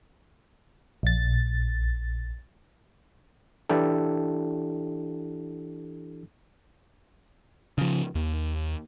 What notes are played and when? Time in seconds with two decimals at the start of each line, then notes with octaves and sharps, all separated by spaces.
1.03 A#1 A6
3.69 E3 D4 E4 G4 A4
7.78 C#3 F3
8.15 D#2